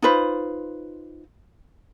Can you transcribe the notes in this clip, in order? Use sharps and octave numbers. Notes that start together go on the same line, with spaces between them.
D#4 F4 B4 C5